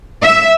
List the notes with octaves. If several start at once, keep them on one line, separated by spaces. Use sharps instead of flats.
E5